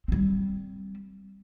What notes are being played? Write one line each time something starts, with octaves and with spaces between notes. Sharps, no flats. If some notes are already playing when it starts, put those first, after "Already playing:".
G3 C4